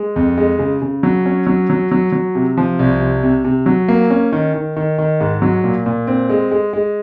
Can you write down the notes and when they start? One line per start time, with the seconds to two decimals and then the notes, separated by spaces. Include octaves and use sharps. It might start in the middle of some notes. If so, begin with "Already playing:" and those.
Already playing: G#3
0.16 F2
0.38 G#3
0.59 C#3
0.82 C#3
1.03 F#3
1.26 C#4
1.47 F#3
1.70 F#3
1.92 F#3
2.12 F#3
2.35 C3
2.57 F3
2.79 C2
3.00 C3
3.23 C3
3.45 C3
3.66 F#3
3.88 A#3
4.10 C#4
4.32 D#3
4.54 D#3
4.76 D#3
4.98 D#3
5.21 G#2
5.42 F#3
5.64 A#2
5.86 A#2
6.07 C4
6.29 G#3
6.51 G#3
6.73 G#3